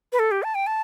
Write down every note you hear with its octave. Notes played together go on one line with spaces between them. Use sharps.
B4
A4
G4
A5
G5
A5